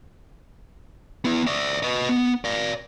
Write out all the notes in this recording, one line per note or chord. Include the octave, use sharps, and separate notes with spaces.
B3 E4
D5 E5
B4 D#5
B3
D5 F5